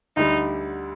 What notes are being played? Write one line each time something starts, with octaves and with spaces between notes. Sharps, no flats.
D2 D3 G3 D#4